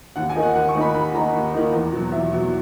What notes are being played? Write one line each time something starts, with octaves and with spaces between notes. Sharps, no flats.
D#2 F#5
G#5
D#3 A#3 D#4
F#5
D#2 F#5
C#6
D#3 A#3 D#4
B5
D#2 B5
D#3 A#3 D#4 A#5
D#2
D#3 A#3 D#4
E2
B2 F#3
E2 E5
B2 F#3